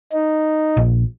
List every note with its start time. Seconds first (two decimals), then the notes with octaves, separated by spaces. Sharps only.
0.13 D#4
0.77 A#1